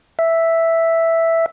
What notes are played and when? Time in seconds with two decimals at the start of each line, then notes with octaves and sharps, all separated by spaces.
0.19 E5